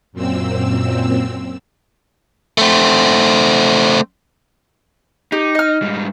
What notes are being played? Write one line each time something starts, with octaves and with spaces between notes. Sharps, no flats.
F#2 A#2 C4 E6
A3 C4
D#4 G4
D#5 F6
G#2 G3